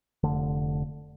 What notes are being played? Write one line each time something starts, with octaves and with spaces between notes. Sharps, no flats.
F1 D3 A3